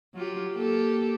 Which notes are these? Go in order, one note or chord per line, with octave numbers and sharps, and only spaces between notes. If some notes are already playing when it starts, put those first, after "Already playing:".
F#3 F4 G4
A#3 G4 A4